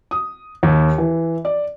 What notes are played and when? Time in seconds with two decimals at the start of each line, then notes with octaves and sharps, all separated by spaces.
0.11 D#6
0.63 D#2
0.98 E3
1.45 D5